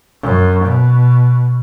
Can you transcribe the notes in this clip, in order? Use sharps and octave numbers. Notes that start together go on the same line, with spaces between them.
F#2
B2